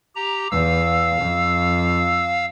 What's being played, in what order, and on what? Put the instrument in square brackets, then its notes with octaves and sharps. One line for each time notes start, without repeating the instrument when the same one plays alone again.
[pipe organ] G4 A#5
[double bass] E2 [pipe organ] F5 E6
[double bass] F2